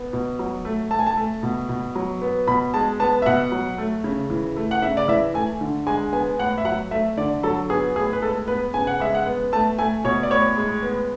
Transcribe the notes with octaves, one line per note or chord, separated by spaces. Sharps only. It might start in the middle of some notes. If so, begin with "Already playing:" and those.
Already playing: B3
B2
F#3
A3
A3 A5
G#5
A5
A3
B2
B2
F#3
B3
B2 B5
G#3 A5
B3 A5
E5
B2 F#5
F#3
A3
C#3
E3
A3
F#5
C#3 E5
D5
E3 E5
A3 G#5
D3
G#3 G#5
B3 G#5
A2 F#5
E5
F#3 F#5
A3 E5
D3 D5
F#3 A4
B3 G#4
A2 G#4
B4
G#3 A4
B3 B4
C#3 G#5
F#5
G#3 E5
F#5
B3
A3 A5
A3 G#5
B2 C#5
D5
A2 C#5
G#3
B3